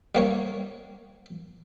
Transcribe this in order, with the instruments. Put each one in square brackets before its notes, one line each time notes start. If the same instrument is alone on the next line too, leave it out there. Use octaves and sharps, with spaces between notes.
[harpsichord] G3 A#3 C#5